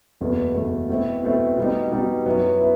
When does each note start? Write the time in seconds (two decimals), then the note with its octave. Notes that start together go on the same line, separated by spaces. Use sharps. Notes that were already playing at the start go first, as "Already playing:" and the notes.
0.21 F#1 E2 B2 A3
0.55 F#1 E2 B2 A3
0.89 B2 A3 C4 E4
1.23 B2 A3 C4 E4
1.57 B2 G3 D#4
1.92 B2 G3 D#4
2.26 F#2 F#3 B3 E4
2.60 B3 E4